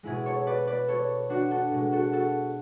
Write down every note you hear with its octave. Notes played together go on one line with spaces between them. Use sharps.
B2 G#3 E4 G#4
A4 C#5
B4 D5
B4 D5
A4 C#5
D4 F#4
F#4 A4
B2 G#3
F#4 A4
F#4 A4